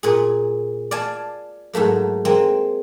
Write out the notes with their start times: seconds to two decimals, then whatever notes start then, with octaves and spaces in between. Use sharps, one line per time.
0.03 A#2 G#4
0.91 D5 F5 G#5 A5
1.73 G#2 F#3 A3 A#3
2.25 G#3 A#3 C4